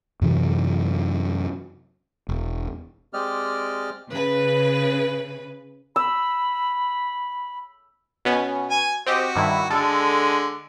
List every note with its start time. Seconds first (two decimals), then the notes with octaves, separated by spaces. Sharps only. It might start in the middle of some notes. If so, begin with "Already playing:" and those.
0.22 F#2 C3 E3 F#3
2.29 E1
3.13 G#3 C4 G4 D5 D#5 F6
4.11 C#3 B4
5.96 B5 E6
8.25 B2 B3 C#4
8.70 G#5
9.06 C4 F#4 G4 D#5
9.36 G2 D#3 E4
9.70 D3 G#3 A4